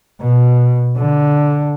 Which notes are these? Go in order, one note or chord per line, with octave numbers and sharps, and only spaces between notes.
B2
D3